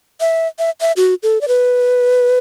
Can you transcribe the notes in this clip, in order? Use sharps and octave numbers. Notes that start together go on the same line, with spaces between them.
E5
E5
E5
F#4
A4
D5
B4